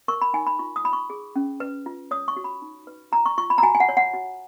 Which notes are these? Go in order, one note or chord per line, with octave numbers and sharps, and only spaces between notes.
A#4 C#6
B5
D#4 G#5
B5
F4 C#6
D#6
F4 B5
C#6
G#4
C#4
B4
F4
C#5 D#6
C#6
F#4
B5
D#4
B4
F4 A#5
C#6
F4 C#6
B5
A#5
F#4 G#5
G#5
F#5
C#5
F#5
F#4